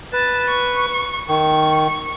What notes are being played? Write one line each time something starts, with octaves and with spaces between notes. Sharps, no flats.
B4 A5
C#6
D#3 C#6